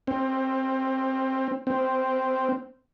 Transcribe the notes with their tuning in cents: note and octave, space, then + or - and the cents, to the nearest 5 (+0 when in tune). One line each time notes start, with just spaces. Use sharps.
C4 +15
C4 -5